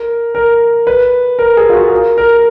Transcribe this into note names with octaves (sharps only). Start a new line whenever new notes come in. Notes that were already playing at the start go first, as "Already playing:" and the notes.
Already playing: A#4
A#4
B4
A#4
G#4
F4
F#4
G#4
A#4
A#4